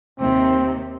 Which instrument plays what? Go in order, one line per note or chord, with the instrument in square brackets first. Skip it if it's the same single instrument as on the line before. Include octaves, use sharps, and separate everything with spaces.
[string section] D#2 C3 [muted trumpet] C4